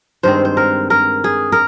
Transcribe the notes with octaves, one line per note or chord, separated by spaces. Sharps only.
G2 D#3 G#3 C4 C5
C5
A#4
A#4
G#4
A#4